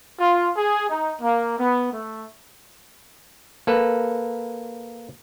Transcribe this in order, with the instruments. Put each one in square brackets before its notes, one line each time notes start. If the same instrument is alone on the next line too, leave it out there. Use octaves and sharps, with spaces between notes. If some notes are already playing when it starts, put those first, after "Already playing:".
[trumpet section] F4
G#4
D#4
A#3
B3
A3
[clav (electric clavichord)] A#3 A4 B4